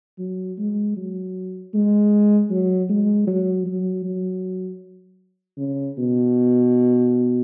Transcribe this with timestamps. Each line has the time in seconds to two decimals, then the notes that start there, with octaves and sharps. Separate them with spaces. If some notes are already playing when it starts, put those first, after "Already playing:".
0.18 F#3
0.58 G#3
0.97 F#3
1.74 G#3
2.50 F#3
2.89 G#3
3.27 F#3
3.66 F#3
4.04 F#3
5.58 C#3
5.98 B2